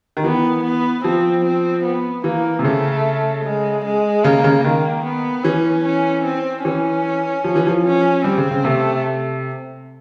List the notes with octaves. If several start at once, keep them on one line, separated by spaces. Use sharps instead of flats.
D#3
E3 B3
B3
F3 C4
C4
B3
E3 A#3
C3
C#3 A3
G#3
G#3
C#3 A#3
C#3
D#3 A#3
B3
E3 C#4
C#4
C4
E3 C#4
F3
E3
F3
C#4
G3 C4
C#3
C#3
C3 A3